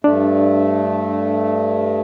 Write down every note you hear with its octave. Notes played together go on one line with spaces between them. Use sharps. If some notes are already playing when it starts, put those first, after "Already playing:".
G2 A3 D4